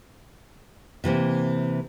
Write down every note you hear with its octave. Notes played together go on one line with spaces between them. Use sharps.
C3 E3 A#3 C4